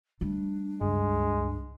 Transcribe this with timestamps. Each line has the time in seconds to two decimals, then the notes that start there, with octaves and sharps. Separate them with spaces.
0.21 G3 A3 D4
0.81 D1 G1 C#2 G2 G#3